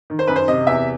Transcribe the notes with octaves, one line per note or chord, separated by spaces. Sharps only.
D#3
C5
F#2 B4
C5
C3 D#5
E2 E5